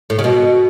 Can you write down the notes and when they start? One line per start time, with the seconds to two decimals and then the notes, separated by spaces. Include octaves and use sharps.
0.10 A2
0.19 C#3
0.24 B2